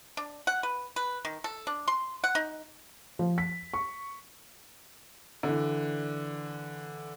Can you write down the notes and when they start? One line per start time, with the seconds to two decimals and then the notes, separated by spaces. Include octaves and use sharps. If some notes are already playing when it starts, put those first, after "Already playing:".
0.17 D4
0.47 F#5
0.63 B4
0.96 B4
1.25 D#3
1.44 A4
1.67 D4
1.88 C6
2.24 F#5
2.35 D#4
3.19 F3
3.38 B6
3.74 C#6
5.43 D3 E3